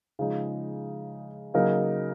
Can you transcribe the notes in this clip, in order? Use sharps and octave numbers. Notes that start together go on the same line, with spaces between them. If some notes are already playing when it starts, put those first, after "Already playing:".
C#3 F3 G#3 D#4
C#3 F#3 A#3 D#4 A#4